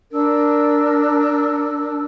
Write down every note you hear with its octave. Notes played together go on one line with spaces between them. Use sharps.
D4 A#4 E6